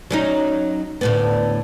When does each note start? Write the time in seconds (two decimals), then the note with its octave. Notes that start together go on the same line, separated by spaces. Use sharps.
0.11 F#3 C#4 D#4
1.01 D2 A2 B3